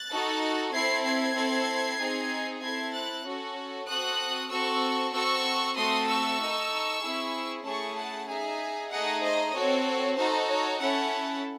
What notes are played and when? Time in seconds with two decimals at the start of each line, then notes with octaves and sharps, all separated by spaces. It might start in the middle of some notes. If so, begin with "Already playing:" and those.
Already playing: F#6 A6
0.10 D#4 F#4 A4
0.74 C4 E4 A4 G#6 C7
1.05 G#6 C7
1.36 C4 E4 A4
2.00 C4 D#4 G#4
2.62 C4 E4 A4 G#6 C7
2.93 F#6 A6
3.25 C#4 F#4 A4
3.88 C4 F#4 A4 D#6 F#6
4.51 C4 F#4 A4 C#6 E6
5.14 C4 F#4 A4 C#6 E6
5.77 A3 C4 F#4 A4 C6 D#6
6.09 C#6 E6
6.40 D#4 A4
7.03 C4 E4 G#4
7.66 A3 C#4 E4 G#4 A5 C#6
7.98 F#5 A5
8.29 D#4 G#4 E5 G#5
8.91 A3 D#4 G#4 D#5 F#5
9.24 C5 D#5
9.55 C4 F#4 A4 C#5
10.17 D#4 F#4 A4 C5
10.49 C#5
10.80 C#4 E4 A4 F#5 A5